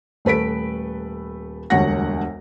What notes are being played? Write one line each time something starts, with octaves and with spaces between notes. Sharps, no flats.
D#1 A3 B4 B6 D7
E1 D2 G2 C#5 F#5 A#6